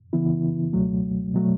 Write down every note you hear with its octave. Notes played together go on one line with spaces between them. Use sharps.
C#3 E3 B3 E4
C#2 B2 F#3 A3
B2 F#3 A3